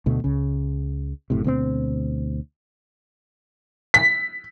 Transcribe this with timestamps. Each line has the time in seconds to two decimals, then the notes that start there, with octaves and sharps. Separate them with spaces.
0.06 D2 B2 A3
0.24 C#2 C#3
1.30 F#1 A2 C3
1.44 D2 B2 A#3 C4
3.94 B6